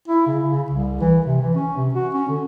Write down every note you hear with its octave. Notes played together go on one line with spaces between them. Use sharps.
E4
C#3
C#3
C2
E3
C3
E3
C#4
C3
F#4
C#4
D3